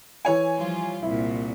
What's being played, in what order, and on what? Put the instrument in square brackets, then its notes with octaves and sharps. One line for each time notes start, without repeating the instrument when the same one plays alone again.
[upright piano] E3 C#5 G#5
[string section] F3 G3 F4
[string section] C2 A#2 [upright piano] E4